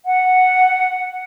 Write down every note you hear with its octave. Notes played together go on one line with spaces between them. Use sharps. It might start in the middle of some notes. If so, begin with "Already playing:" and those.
F#5